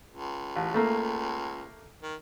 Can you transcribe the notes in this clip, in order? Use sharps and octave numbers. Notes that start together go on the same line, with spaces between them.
C#2
A1
A3 A#3
D#3